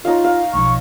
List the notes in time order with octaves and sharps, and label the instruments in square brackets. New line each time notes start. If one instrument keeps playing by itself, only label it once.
[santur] D#4 C#5 F5 [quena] F4
[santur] F5
[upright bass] B1 F3 [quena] C#6